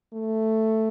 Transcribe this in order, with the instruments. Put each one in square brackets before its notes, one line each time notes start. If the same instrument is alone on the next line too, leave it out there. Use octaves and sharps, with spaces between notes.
[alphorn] A3